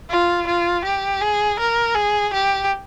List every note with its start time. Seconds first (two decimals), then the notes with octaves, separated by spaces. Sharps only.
0.10 F4
0.47 F4
0.85 G4
1.21 G#4
1.59 A#4
1.95 G#4
2.33 G4